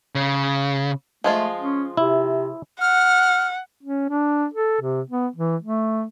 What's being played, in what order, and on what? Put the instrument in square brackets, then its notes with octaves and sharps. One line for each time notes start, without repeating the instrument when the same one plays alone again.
[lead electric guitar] C#3
[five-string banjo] F3 G#3 F4 [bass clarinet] A3
[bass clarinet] C#4
[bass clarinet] C3 [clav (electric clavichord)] E4
[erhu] F#5 [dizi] F6
[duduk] C#4
D4
A4
C3
B3
E3
A3